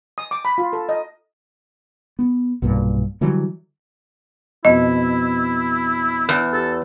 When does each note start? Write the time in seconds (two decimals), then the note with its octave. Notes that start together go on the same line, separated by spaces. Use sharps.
0.18 D#6
0.31 D6
0.45 B5
0.58 F4
0.73 A4
0.89 D#5
2.19 B3
2.62 B1 G2 A#2
3.21 D3 E3 F#3 G3
4.65 F2 B2 E4 D#5
6.29 E2 G6
6.53 G4 A4